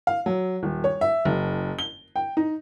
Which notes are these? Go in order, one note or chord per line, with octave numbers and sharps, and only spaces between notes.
F5
F#3
D#1
C#5
E5
F#1
G7
G5
D#4